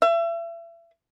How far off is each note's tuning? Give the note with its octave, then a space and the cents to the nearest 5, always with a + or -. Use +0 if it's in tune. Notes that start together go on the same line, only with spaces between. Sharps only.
E5 +35